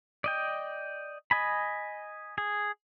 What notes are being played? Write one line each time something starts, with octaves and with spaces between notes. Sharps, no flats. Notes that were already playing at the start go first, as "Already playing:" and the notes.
D5 D#5 G5
D#5 G#5 B5
G#4